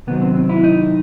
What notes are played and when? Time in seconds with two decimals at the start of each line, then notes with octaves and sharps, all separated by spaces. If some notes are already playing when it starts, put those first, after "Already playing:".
0.07 C3 D#3 F#3 B3
0.21 C4
0.35 C4
0.49 E4
0.63 D#4